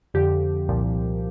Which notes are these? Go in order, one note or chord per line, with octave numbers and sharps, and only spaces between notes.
F2 D3 F3 G4
C2 A#2 F3